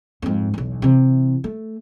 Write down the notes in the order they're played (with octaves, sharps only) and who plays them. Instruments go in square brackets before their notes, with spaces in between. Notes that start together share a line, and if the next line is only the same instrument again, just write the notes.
[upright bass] F2 G#2
B1 E2
C3 E3
A3